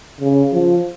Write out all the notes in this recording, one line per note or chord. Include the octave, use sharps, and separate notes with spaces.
C#3
F3